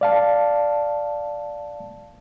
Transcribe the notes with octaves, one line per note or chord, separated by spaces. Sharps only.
D5 F5 A5